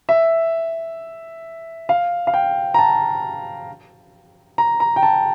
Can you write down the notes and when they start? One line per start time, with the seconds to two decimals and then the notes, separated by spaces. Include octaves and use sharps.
0.09 E5
1.89 F5
2.27 F5
2.34 G5
2.74 A#5
2.79 A5
4.58 A#5
4.80 A#5
4.96 G5
5.03 A5